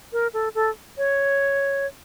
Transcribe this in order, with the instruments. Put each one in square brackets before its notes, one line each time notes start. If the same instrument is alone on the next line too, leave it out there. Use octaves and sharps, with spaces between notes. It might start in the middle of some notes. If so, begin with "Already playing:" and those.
[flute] A#4
A4
A4
C#5